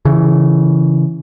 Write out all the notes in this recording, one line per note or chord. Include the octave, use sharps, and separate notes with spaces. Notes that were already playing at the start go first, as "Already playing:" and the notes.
C#3 E3